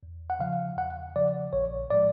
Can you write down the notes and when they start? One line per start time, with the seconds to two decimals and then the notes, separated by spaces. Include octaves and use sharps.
0.03 E2
0.30 F#5
0.39 C#3 F3 F5
0.77 E2 F#5
1.16 C#3 F3 D5
1.53 A#1 C#5
1.90 A2 F3 G#3 D5